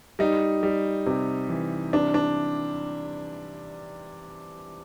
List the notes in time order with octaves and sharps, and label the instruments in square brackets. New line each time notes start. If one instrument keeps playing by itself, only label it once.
[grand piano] G3 [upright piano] D#4
[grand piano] G3
C3
E3
[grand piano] C3 [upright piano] D4
[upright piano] D4